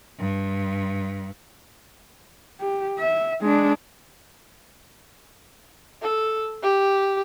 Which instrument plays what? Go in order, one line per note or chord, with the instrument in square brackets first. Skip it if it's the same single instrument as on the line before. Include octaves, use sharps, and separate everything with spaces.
[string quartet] G2
[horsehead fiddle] G4
E5
G#3 D4
[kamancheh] A4
G4